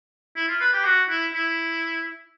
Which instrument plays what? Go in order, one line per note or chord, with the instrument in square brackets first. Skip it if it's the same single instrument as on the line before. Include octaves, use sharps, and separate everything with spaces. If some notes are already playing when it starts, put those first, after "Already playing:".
[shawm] E4
F4
B4
G4
F#4
E4
E4